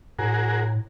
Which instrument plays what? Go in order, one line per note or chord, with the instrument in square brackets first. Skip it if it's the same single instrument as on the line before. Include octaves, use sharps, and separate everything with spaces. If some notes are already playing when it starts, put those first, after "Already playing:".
[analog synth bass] A2 [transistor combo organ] F#4 G#4 A#4